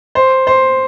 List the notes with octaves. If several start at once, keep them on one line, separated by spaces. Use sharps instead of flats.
C5
C5